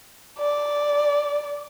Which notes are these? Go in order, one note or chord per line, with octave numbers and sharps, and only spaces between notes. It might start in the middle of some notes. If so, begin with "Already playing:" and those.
D5